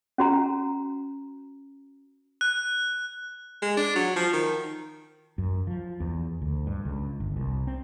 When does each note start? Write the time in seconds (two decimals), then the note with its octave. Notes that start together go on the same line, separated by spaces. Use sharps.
0.18 C#4 F#4 A#5
2.41 F#6
3.62 G#3
3.77 D4
3.96 F#3
4.16 F3
4.33 D#3
5.38 F#2
5.67 F3
6.00 E2
6.42 D2
6.67 G2
6.85 C#2
7.20 G1
7.37 C2
7.67 C4